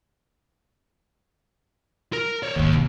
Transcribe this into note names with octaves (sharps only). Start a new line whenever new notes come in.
A#4
C#5 D5
A1 D#2 G#2
C3 E3